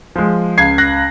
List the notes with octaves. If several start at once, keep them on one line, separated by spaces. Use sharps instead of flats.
F3 G#3
C#2 G#6 C7
F#6 A#6